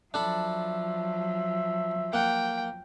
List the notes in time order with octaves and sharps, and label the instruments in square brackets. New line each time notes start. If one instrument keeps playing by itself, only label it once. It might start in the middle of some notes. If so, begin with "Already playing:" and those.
[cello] F3 F#3 [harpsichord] D4 A4 B5 [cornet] E5
[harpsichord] A#3 F#5 [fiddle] G5